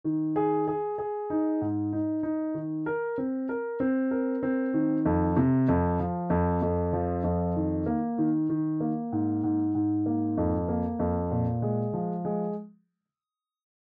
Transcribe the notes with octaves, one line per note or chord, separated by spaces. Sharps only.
D#3
G#4
G#4
G#4
D#4
G#2
D#4
D#4
D#3
A#4
C4
A#4
C4
A#4
C4
D#3
F2
C3
F2
F3
F2
F2
F3
F2
D#3
A#3
D#3
D#3
A#3
G#2
G#2
G#2
A#3
F2
A#3
F2
A#2
G#3
F3
G#3